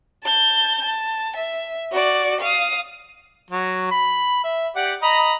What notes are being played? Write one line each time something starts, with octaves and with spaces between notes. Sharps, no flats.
A5 G6
A5
E5
F#4 D5
F5 D#6
F#3
B5
E5
G4 D5 F#5
D#5 A#5 B5